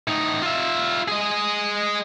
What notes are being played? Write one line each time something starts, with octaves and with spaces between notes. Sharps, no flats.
A2 D#4
F4 E5
G#4 D#5